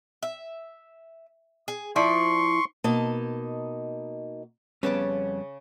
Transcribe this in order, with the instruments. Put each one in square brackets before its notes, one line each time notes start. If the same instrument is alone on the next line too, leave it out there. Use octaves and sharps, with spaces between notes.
[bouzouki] E5
G#4
[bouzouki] F3 E4 D5 [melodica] C6 C#6
[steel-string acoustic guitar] B2 A#3 D#4 D#5 A5
[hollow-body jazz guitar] F2 B3 C#4 [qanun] C#3 A5 D6 [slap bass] G3